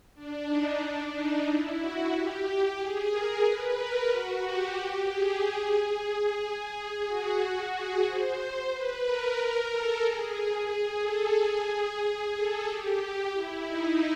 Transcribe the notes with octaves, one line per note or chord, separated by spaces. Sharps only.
D4
D#4
D4
D#4
E4
F#4
G4
G#4
A#4
B4
A#4
F#4
G4
G4
G#4
G#4
F#4
G#4
C5
B4
A#4
A4
G#4
A4
G#4
G#4
A4
G4
E4
D#4